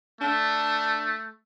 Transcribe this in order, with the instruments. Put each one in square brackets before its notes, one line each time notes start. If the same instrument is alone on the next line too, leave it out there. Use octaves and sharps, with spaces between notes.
[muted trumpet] A3 [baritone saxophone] D4